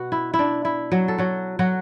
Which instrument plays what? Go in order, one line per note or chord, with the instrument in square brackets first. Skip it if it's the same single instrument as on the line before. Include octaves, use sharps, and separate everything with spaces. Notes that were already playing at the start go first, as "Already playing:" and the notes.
Already playing: [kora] B2 B3 F#4
E4
E4
D4
E4
F#3 F#4
A4
F#3 F#4
F#3 F#4